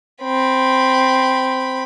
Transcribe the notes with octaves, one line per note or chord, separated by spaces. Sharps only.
C4 B5